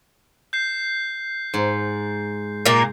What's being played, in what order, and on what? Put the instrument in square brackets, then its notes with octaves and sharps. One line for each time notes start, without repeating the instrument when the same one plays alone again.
[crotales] G6 C7
[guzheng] G#2
[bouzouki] A#2 A#3